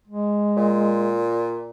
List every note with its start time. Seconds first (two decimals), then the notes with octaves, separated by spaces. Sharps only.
0.07 G#3
0.57 A#2